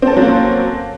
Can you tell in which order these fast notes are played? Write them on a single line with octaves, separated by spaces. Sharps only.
C4 A4 C#4 F#3 A#3